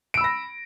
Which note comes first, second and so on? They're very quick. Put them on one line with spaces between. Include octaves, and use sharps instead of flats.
D7 E6 B5 A#6